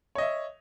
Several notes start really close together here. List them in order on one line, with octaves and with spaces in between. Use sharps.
C#5 D#5 E5